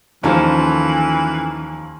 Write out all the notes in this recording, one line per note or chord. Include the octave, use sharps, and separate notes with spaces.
D#2 E3 F3 C#4 F4 A4 C5